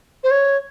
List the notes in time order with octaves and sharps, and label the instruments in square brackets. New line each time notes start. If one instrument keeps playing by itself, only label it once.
[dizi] C5
C#5